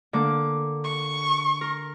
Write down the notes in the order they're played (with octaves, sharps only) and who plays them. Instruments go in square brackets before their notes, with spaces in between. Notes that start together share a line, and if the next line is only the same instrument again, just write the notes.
[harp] D3 A#3 D6
[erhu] C#6
[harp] A#4